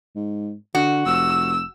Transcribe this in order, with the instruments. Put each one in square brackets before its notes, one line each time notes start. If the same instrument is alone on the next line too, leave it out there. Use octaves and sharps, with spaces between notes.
[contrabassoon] G#2
[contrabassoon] D3 [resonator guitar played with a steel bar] F#4
[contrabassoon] F1 [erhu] E6